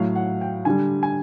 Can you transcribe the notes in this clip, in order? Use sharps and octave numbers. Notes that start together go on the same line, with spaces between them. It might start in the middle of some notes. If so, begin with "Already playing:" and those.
Already playing: A2 F#3 F5
F#5
G5
D3 G3 G#5
G#5